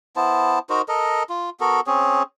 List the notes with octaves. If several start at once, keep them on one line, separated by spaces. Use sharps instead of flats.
B3 E4 C5 A5
D#4 F#4 A#4 C5
A4 A#4 D#5
F4
B3 F#4 A4 A#4
C4 C#4 G#4 C#5